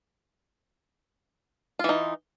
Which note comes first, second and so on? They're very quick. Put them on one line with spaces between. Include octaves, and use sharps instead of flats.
F4 E3 D#4